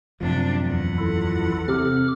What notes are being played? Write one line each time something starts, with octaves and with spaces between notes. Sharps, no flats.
A1 F#2 C3 F3 D4
E2 F#5
E4 F4 A4
C3 A4 D6 F6